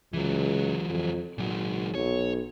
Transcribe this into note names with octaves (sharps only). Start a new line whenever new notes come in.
C#2 E3 F#3
F2
G#1 A#2 F#3
B1 C#5